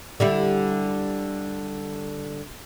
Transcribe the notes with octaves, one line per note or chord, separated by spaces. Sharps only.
D3 G3 E4